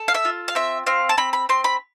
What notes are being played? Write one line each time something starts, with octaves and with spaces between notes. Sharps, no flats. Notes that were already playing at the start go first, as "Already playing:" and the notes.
Already playing: A4
F5
E5
F4
F5
C4 E5
C4 F5
A5
C4 B5
B5
C4 C6
B5